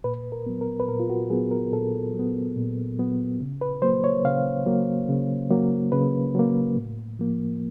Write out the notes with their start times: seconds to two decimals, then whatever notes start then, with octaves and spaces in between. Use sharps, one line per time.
0.04 A#2 B4
0.32 A#4
0.46 F#3 B3
0.61 A#4
0.80 B4
0.88 A#2 A#4
1.00 F4
1.09 F#4
1.30 F#3 B3 G#4
1.51 A#4
1.72 A#2 A4
2.14 F#3
2.19 B3
2.56 A#2
2.99 F#3 B3
3.41 C#3
3.61 B4
3.82 F#3 A#3 C5
4.04 C#5
4.25 C#3 F5
4.66 F#3 A#3
5.09 C#3
5.50 F#3 A#3
5.92 C#3 B4
6.35 F#3 A#3
6.76 A2
7.19 F3 A#3